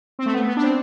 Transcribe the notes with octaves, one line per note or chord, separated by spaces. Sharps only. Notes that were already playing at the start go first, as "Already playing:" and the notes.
C4
A3
B3
B3
D4
C4